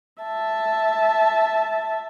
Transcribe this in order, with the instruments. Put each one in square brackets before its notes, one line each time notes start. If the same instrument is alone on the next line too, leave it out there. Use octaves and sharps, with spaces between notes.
[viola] E5 A5